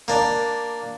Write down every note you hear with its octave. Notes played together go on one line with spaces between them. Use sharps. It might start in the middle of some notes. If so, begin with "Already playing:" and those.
A#3 D4